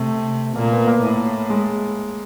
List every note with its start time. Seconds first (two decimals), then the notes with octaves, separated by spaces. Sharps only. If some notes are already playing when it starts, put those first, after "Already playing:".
Already playing: C3 A3
0.55 A#2 A#3
0.72 B3
0.87 A#3
1.03 A2
1.50 G#3